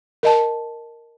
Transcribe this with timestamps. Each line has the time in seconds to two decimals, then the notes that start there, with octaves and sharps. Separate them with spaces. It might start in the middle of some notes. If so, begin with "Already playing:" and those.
0.23 A#4 D#5 A5